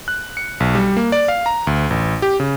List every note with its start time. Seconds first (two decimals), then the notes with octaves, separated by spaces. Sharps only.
0.08 F#6
0.37 C#7
0.60 B1
0.75 G3
0.97 A#3
1.12 D5
1.28 F5
1.46 A#5
1.67 D2
1.90 A1
2.22 G4
2.40 C#3